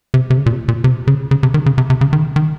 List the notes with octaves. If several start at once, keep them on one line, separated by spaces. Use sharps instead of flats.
C3
C3
C#3
A#2
C3
A#2
C3
C#3
C#3
C3
D#3
C#3
C3
C3
C#3
D#3
D#3